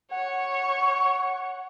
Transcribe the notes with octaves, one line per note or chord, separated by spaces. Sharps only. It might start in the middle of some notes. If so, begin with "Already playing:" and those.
C#5 F#5 C#6